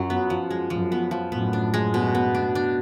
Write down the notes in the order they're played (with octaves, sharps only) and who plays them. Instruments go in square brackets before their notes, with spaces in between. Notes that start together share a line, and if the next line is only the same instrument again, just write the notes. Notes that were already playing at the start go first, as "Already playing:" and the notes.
Already playing: [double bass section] F#2 [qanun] F#3 F4
[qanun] B3
F3
G#3
[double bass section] F#2 [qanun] F3
[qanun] B3
F3
[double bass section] F#2 A2 [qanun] B3
[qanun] D4
G#3
B2
B3
D4
D4